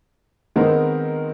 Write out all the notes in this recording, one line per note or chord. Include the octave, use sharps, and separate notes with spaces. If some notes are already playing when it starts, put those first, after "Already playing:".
D#3 G#3 B3 C4 D#4 A#4